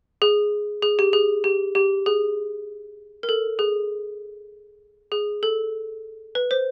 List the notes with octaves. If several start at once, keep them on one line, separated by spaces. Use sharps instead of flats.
G#4
G#4
G4
G#4
G4
G4
G#4
A#4
A4
G#4
G#4
A4
B4
C5